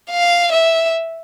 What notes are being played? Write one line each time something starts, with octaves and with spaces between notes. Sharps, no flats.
F5
E5